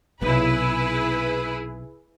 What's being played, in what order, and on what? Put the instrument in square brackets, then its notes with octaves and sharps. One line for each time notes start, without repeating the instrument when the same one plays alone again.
[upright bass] B1 C3 [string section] E4 G#4 B4